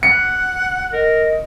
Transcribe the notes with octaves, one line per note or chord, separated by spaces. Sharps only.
F#5 C#7
A#4 D#5